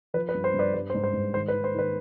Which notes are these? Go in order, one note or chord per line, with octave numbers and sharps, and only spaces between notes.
F3 B4
B4
G2
C5
G2
B4 D5
G3 B4
C5
G#2
C5
G#2
D#3 C5
B4
D#3
C5
D#3 B4